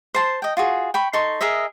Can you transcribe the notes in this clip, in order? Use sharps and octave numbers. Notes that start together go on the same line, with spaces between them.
C5 A5 C6
D#5 G5
F4 F#4 G#4
G5 B5 C#6
D#4 A4 C6 C#6
G#4 A#4 D#5 E5